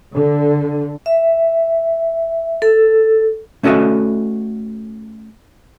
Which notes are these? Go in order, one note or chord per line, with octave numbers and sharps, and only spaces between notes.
D3
E5
A4
A3 C#4 F#4 A4 D#5 E5